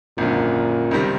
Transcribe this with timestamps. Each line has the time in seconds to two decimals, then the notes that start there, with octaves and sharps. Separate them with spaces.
0.18 G#1 F#2 A#2 D3
0.91 C#2 C3 D#3 G3